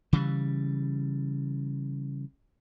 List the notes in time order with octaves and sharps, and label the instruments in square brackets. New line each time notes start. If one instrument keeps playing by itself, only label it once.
[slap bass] C#3 E3 G3